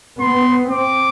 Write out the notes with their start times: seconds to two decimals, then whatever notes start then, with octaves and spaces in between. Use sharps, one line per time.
0.21 B3 C6
0.71 C4 D6